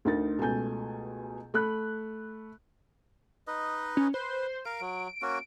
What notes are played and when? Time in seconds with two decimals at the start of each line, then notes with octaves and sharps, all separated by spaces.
0.05 D2 D3 D#4 A#4 A6
0.39 C#2 B2 A3 G#5 G6
1.54 A3 B5 F#6
3.47 D#4 B4 D#5
3.97 C#4
4.14 B4 C5
4.65 A#4 F5 D7
4.81 F#3
5.22 A#3 C#4 F#4